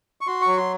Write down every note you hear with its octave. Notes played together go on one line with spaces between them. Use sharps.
C#6
F#4 C6
C#6
F#3
C6